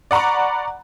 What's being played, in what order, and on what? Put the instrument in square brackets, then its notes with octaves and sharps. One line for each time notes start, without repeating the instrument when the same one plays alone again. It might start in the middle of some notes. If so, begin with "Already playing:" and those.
[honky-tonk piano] D5 F#5 A#5 B5 C#6